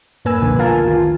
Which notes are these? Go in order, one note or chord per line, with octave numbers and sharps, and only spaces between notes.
F#2 A2 A#3 B4 G#5 E6
C2 F2 B2 D3
F4 A#4 F5 G#5 A5
D#3 F4